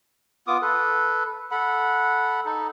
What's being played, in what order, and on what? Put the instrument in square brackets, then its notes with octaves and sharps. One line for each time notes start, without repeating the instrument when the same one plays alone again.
[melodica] B3 F4 D6 D#6
A4 B4
A4 F#5 B5
D#4 A4